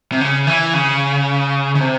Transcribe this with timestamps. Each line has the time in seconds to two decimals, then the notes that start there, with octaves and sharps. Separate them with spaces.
0.12 C3
0.21 C#3
0.47 E3
0.74 C#3
1.75 C#3
1.80 C3